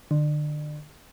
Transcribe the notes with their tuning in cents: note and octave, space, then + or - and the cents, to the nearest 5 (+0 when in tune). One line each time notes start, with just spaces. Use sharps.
D3 +35